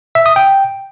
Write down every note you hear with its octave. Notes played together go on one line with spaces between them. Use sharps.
E5
D#6
G5